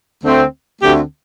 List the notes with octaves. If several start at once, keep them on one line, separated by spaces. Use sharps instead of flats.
D2 D3 A3 C4
D2 D3 A3 C4 G4